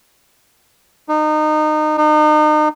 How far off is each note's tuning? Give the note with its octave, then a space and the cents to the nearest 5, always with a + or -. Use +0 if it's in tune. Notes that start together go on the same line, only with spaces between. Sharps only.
D#4 -25
D#4 -35